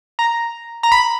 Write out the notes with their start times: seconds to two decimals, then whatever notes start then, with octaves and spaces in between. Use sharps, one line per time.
0.19 A#5
0.83 A#5
0.92 B5